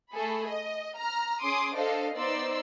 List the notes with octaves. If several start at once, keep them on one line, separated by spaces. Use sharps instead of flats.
A3 G#4 A4 B5
D#5
A#5 F6
C#4 G#4 C6 D6 D#6 D7
D4 A4 C5 D#5 F5
B3 D#4 C5 D5 C6 E6